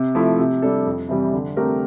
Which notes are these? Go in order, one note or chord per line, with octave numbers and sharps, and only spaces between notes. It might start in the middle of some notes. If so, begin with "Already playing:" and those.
Already playing: C3
F3 A3 E4
C3
G3 D4 A4
F2
C3 E3 G3
D3
A3 C4 G4 A#4